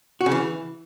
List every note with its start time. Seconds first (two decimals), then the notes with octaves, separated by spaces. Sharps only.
0.21 F#4
0.26 C#3
0.31 E3